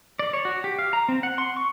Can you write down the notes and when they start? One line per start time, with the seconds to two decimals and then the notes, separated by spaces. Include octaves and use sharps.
0.19 D5
0.33 C#5
0.45 F#4
0.64 G4
0.79 F5
0.93 A#5
1.09 C4
1.23 F#5
1.38 C6
1.56 C#6